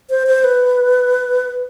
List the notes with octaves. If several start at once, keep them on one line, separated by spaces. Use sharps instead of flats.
C5
C5
B4